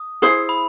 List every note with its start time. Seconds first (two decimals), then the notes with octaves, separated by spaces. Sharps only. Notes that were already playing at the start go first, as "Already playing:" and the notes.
Already playing: D#6
0.22 E4 G#4 C5
0.49 B5